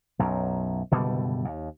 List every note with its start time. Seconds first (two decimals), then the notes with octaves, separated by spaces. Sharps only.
0.19 B1 F#2
0.91 F#1 B2 D3 G3
1.45 D#2